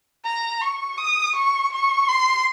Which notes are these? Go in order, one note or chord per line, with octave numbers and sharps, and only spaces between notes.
A#5
C#6
D#6
C#6
C#6
C6